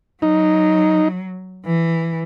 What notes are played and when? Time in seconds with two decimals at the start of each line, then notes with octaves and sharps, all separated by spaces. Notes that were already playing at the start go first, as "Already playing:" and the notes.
0.22 F#3 D#4
1.66 E3